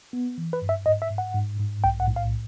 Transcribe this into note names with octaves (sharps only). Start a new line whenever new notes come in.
B3
E3
B4
G2
E5
G#2 D#5
E5
G#2
F#5
G#2
G#2
B1 G5
F#5
A2
F5